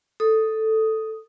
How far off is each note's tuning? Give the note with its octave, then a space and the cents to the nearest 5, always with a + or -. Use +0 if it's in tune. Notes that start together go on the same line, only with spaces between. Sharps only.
A4 +0 D#6 +0